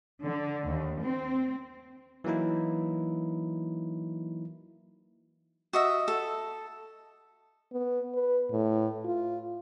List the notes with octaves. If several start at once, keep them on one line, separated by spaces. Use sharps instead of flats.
D3
D#2
C4
E3 F#3 A#3 D#4 E4
F#4 D#5 E5
A4
B3
B4
A2
F4